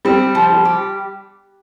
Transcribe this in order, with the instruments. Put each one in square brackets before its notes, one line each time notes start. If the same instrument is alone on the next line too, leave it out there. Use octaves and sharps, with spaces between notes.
[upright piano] G3 [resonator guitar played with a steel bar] C4
[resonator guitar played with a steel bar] F3
[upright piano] G3
[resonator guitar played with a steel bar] G4